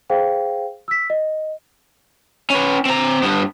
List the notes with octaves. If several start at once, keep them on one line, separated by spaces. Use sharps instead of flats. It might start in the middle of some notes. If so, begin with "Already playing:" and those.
G#4 C5 F5 G5
E6 B6
D#5
C#4 B4
C4 A#5
G2 B3